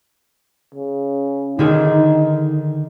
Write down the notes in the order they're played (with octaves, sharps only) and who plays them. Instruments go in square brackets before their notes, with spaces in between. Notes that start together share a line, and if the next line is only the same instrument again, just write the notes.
[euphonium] C#3
[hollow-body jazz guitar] D3 D#3 G#4 [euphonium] D#4